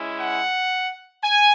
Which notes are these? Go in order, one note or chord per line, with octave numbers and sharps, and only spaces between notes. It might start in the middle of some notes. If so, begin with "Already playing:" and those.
Already playing: G#3 C#4 E4
F#5
G#5